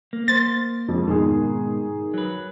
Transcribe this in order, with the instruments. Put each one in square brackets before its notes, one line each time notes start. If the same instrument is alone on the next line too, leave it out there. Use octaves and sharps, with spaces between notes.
[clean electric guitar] A#3
[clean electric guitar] A#3 C5 [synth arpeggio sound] A6
[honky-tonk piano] F2 F3 G#3
[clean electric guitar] G#2 B2 [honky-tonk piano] D#3 G#4
[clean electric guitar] F#3 B4